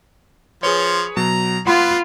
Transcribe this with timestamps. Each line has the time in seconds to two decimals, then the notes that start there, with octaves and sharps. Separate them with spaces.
0.63 F3 G#4 B4 C#5 C6
1.17 B2 F#3 A#5
1.67 B3 F4 F#5 B5 C6